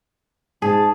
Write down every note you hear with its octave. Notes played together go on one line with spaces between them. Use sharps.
G#2 G#4 A5